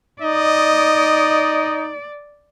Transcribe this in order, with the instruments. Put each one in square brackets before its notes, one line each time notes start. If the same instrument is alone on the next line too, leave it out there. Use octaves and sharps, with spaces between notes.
[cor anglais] D#4 [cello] D5 [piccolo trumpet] D#5